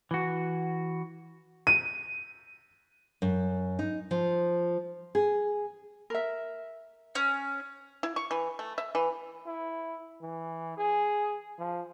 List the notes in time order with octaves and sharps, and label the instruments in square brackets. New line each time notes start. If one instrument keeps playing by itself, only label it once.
[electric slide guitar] E3 F#4
[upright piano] D#7
[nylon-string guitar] F#2
D#4
F3
G#4
[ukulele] A#4 E5
[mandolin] C#4
[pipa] E4
C#6
E3
A3
E5
E3
[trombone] E4
E3
G#4
F3